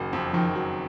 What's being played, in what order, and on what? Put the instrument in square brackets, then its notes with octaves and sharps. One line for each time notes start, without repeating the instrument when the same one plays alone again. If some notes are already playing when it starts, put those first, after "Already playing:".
Already playing: [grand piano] F#1 D#3 F#3
F2
[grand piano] D#3 [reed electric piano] F3
[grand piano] F#3